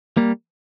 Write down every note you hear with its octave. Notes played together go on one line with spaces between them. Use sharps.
G3 A#3